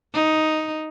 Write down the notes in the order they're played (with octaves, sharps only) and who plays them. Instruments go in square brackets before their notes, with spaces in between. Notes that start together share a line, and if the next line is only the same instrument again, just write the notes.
[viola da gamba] D#4